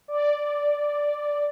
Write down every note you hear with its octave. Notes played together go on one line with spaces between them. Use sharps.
D5